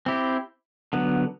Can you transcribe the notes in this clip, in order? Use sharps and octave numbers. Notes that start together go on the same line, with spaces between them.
C4 E4 G4
D3 F#3 B3